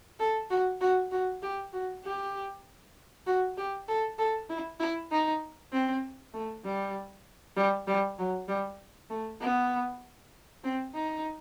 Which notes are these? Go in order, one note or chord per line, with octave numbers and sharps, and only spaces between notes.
A4
F#4
F#4
F#4
G4
F#4
G4
F#4
G4
A4
A4
E4
E4
D#4
C4
A3
G3
G3
G3
F#3
G3
A3
B3
C4
D#4